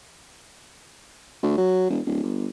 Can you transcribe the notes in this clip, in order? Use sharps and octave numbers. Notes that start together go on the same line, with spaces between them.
D2
F#3
E1
D1
G1